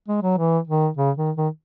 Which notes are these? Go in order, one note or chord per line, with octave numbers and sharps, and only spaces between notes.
G#3
F#3
E3
D#3
C#3
D#3
D#3